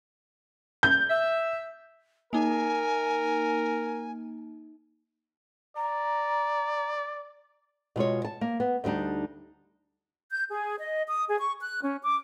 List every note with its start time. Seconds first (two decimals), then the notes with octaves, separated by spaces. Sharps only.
0.83 G6
1.10 E5
2.33 A#3 D#4 A#4 G#5
5.76 D5 A#5
7.96 B2 G#3 F4 C#5
8.25 A5
8.41 A#3
8.60 B3
8.84 D2 D3 G3 D4 D#4
10.31 G6
10.49 G#4
10.78 D#5
11.07 D#6
11.27 G#4
11.39 C#6
11.60 F#6
11.82 C#4
12.02 D6